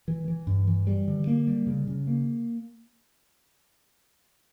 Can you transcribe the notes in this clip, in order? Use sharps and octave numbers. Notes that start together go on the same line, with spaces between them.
E3
E3
G2
E3
G3
D3
A#3
G3
C#3
C#3
A#3